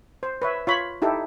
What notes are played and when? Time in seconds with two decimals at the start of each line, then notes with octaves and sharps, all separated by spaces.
0.23 C5
0.42 B4 C#5 E5
0.67 F4 C#5 B5
1.02 D#4 E4 G4 A4